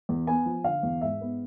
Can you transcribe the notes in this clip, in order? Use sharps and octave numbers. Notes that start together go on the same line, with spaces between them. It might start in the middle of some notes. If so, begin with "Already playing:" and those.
E2
B3 G#5
F3
D3 F5
E2
G#2 E5
B3